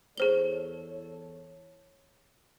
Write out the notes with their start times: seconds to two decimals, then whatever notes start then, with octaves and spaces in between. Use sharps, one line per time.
0.18 E2 G#4 A4 C5 C#5 G7